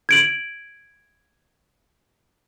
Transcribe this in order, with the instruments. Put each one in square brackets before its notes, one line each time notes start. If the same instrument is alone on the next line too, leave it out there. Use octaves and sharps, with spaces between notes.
[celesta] G#6 D7 F#7